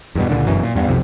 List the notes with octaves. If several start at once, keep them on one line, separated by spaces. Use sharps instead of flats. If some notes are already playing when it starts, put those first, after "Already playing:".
E2 G2 B2
C#2 A#2 D3
G1 F#2 B2 E3
A#2
E2 G2 B3
B1 F2 C3